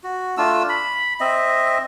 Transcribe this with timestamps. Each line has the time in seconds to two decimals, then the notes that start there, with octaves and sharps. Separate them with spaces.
0.03 F#4
0.37 A3 D4 F4 E6
0.69 B5
1.20 C4 D#5 E5